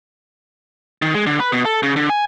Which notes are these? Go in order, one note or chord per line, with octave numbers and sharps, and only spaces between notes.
D#3
G#3
D3
B4
B2
A4
C#3
D3
G#5